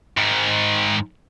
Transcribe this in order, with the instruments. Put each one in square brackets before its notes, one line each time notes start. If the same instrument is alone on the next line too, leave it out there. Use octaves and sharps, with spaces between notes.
[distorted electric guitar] G#2 D#3